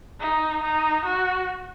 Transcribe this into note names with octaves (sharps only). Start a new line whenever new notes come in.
D#4
D#4
F#4